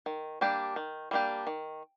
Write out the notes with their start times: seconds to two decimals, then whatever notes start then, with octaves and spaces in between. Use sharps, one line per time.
0.06 D#3
0.41 G3 A#3 D4 G4
0.76 D#3
1.11 G3 A#3 D4 G4
1.47 D#3